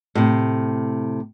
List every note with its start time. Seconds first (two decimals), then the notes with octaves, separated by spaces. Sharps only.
0.15 A2 C3